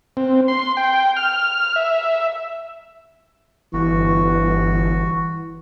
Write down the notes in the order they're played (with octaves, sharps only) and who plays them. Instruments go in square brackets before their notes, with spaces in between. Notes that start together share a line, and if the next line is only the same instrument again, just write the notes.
[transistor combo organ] C4
C6
G5
F6
E5
[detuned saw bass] G1 [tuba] E3 [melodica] F#4